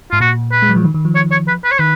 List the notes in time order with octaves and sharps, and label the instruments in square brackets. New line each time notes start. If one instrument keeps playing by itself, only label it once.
[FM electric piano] G#2 [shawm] F4
[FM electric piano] A#2 [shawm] F#4
[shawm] B4
[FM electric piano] G#3
F#3
F3
D#3
D#3
F3
[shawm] C#5
C#5
B4
B4
C#5
[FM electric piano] D#3 [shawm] B4